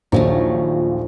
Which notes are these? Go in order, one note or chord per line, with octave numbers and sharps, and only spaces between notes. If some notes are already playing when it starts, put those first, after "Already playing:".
A#1 D#2 A#2 F3 F#3 A3